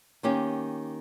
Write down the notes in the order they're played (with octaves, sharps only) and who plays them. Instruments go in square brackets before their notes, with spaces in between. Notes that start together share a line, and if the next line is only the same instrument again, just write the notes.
[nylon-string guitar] D#3 A#3 C#4 G4